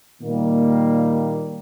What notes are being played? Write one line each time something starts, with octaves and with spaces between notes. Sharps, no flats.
A#2 D#3 G3 A#3